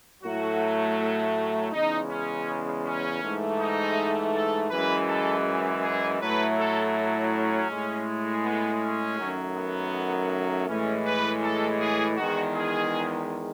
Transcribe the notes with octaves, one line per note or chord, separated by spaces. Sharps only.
A2 F#3 A3 F#4
E2 C#3 G#3 D#4
C#4
C#4
G#2 E3 A3
D#4
A4
F#2 E3 G#3 B4
A4
G#4
A2 F#3 A3 B4
A4
C#4
A2 G#3
B3
C#4
F#2 D#3 F#3 A3
B3
A2 E3 G#3 C#4
B4
A4
G#4
E2 D#3 G#3 F#4
G#4